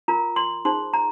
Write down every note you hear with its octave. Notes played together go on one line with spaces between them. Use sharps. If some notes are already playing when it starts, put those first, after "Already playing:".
F4 A#4 A#5
C6
D#4 G#4 C5 C6
A#5